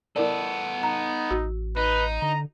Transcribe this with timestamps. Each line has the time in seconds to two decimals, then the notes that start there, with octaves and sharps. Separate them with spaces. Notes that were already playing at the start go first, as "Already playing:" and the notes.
0.16 B3 E4 A4 A#4 D5
0.83 D#4 A#5
1.31 A1 F#4
1.77 D#4 B4
2.22 D3 A#5